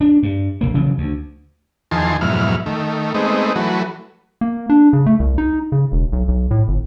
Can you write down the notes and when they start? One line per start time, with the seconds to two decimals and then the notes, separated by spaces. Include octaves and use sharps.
0.01 D4
0.23 G2
0.61 A#1 D#2 A#3
0.74 C#3 E3 F#3
0.98 D2
1.91 E2 D#3 F3 G#5 A5 C6
2.21 F2 G#2 B2 F#3 E4 F6
2.66 D#3 A3
3.14 G#3 A3 B3 C4 D#4
3.56 E3 F#3 A3 F#4 B4
4.41 A#3
4.70 D4
4.93 C#3
5.06 A3
5.20 C2
5.38 D#4
5.72 C#3
5.92 E1
6.13 B1
6.28 B1
6.51 A2
6.68 G1